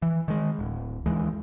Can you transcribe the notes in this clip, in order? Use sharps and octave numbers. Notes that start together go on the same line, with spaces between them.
E3
D#3 G#3
D1
D#2 E3 G#3